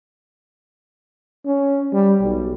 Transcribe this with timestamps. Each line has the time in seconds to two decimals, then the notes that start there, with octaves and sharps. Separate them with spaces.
1.46 C#4
1.93 G3
2.22 B1